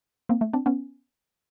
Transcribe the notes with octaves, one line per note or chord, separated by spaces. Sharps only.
A#3 C4
A3
C4 D4
B3 C#4